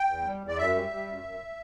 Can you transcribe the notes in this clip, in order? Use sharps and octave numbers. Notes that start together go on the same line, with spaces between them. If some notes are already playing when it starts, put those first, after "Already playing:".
Already playing: G5
E2
G3
E2
D5
F#2 E5
G3
G3
F#2
F#2